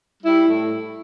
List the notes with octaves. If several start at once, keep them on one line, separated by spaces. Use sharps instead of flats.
G3 E4
A2